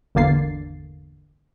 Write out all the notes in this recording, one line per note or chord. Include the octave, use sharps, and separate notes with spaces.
G#1 E2 D3 A#3 A6 C7